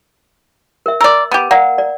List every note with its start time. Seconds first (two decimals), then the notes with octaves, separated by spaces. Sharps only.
0.86 A#4 E5
1.01 A#4 D5 E6
1.31 B3 G4 A#5
1.51 A#3 A#4 D5 F#5
1.78 D5